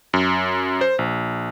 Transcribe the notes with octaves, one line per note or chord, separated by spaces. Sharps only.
F#2
C5
A#1